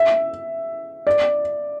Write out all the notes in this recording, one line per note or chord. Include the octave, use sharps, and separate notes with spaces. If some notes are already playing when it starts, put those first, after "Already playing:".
Already playing: E5
D5